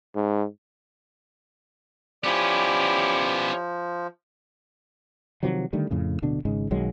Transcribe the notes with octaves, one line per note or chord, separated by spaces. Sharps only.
G#2
F3 B3 C#4 E4 G4 D5
C3 D#3 F3 F#3
D3 D#3 G3 A3
F2 A2 C#3
D1 B2 D3 D4
G#1 G#2 C#3 G#3
B1 D#3 F#3 G#3